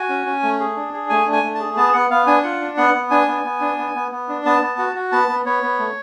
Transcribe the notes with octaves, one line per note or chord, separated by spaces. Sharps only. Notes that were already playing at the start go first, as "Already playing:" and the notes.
Already playing: F#4 G#5
C#4
C#4
A3
G#4
D4
G#4
A3 G#5
D4
G#5
A3
A5
G#4
B3 A5
B3 F#5
B3 F5
D4 G#5
F4 F#5
D4
B3 F#5
B3
D4 G#5
B3
B3
D4
B3
B3
B3
D4
B3 A5
B3
F#4
F#4
B3 A5
B3
B3 C#5
B3
A3